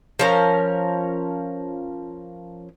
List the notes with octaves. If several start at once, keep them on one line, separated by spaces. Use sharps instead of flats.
F3 C#4 A#4